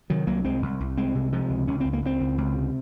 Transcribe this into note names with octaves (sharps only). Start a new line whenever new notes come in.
C3 D#3 F#3
C2 F#3 A#3
C2 G#3 C4
C2
C2
C2 G#3 C4
C3
C3 F3 G#3
C#2
C#2 C#4
C#2 C4
A#3
C#2 G#3 C4
C#2
C#2
C3